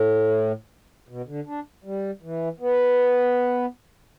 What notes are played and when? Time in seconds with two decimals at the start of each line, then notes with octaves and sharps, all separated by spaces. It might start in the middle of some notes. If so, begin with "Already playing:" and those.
Already playing: A2
1.09 B2
1.27 D3
1.47 D4
1.84 G3
2.22 E3
2.60 B3